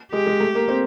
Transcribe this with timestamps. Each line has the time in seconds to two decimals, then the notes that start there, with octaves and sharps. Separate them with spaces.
0.12 G#3 G4
0.27 G#3
0.40 A3
0.55 A#3
0.68 C4